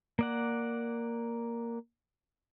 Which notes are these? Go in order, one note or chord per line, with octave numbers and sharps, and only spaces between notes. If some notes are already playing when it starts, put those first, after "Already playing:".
A#3 D5 F#5